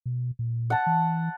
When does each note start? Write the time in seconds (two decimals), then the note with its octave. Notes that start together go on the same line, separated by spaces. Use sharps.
0.06 B2
0.39 A#2
0.70 F#5 A5
0.86 E3